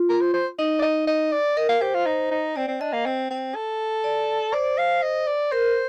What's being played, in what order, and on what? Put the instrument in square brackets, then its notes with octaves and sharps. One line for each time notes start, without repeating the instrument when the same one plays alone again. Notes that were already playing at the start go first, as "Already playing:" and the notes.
Already playing: [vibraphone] F4
[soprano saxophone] A#4
C5
C5
[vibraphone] D#4 [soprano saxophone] D#5
[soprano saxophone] D5
D#5
D#5
D5
[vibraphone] A#4 [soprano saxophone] D#5
[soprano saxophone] F5
[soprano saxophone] G4 [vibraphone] C5
[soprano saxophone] F4
D#4
D#4
[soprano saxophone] C4 [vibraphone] D5
[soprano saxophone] C4
[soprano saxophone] D4 [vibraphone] D#5
[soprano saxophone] A#3
C4
C4
A4
[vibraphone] D5
[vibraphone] C5 [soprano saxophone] D5
[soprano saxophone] F5
D#5
D5
[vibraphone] A#4 [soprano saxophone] C5